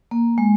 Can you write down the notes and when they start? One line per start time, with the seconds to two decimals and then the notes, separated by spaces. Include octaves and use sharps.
0.11 A#3
0.38 G#3